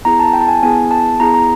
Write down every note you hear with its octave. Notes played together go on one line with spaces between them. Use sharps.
B3 E4 G#4 A#5
A5
G5
A5
G#5
B3 E4 G#4 G#5
A5
B3 E4 G#4 A#5
A#5